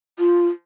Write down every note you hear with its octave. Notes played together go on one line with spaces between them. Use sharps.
F4